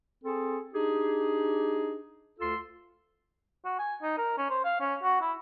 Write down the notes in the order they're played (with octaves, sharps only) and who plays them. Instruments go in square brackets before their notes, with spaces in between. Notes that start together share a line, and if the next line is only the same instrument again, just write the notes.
[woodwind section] C4 G#4 A4
D4 D#4 G4 G#4
D2 F4 A4 C6 E6
[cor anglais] F#4
G#5
D#4
A#4
C#4
C5
F5
C#4
F#4
E4